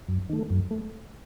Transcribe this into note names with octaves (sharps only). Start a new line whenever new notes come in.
F#2
D#3 A3
F#2
A3